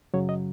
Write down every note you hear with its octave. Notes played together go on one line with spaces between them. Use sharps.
F#2 C#3 F#3 C#5
D#5